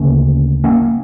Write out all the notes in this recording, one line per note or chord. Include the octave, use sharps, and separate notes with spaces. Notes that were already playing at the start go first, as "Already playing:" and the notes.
Already playing: D2 C#3 A#3 C#4
A#3 C#4